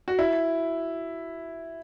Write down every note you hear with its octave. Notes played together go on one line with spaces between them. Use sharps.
F#4
E4